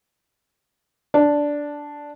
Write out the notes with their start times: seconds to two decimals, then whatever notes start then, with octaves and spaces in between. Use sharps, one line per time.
1.14 D4